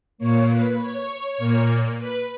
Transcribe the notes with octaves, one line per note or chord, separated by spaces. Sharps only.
A#2 A#3 C#5
B4
C#5
A#2 A#3
B4